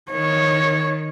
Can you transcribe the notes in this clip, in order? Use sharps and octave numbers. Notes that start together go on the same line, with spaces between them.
D#3 C#5